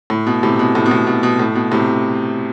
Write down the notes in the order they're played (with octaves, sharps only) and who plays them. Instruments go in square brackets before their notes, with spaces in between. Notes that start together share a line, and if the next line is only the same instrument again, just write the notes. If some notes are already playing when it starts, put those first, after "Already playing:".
[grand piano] A2
B2
A2 C3
B2
A2
B2
A2
B2
B2
A2
B2
A2 C3